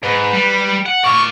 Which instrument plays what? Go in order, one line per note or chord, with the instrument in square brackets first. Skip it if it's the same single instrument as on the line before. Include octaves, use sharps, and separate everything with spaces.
[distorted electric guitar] G#2 [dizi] B4
[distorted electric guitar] G3
F#5
[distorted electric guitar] D5 F5 [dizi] C#6